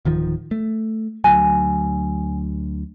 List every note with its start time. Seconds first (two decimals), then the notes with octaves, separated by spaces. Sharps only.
0.05 D1 D#3 F3
0.51 A3
1.24 D2 F#3 G#5